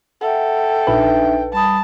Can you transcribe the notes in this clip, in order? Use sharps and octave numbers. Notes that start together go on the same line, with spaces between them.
A4 E5 F#5 G5
A#1 D4 D#4 B4 E5
G3 A5 B5 D#6